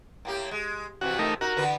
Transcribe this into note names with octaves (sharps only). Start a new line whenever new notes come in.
A2 A#3 G4
G#3
F2 C3 E3 F#4
A3 D#4 A#4
D#4 F#4 A#4
D3 E3 B4